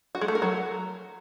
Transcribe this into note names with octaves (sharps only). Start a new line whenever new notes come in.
F#4
G#3
A3
A#4
F#3